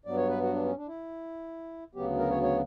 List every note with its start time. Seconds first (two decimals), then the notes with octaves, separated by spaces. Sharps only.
0.05 G2 F#3 B3 D5
0.17 C#5
0.29 B4
0.41 F#4
0.53 D4
0.64 C#4
0.76 D4
0.88 E4
1.95 D2 C#3 F#3 B3 G4
2.18 A#4
2.30 C#5
2.43 C#5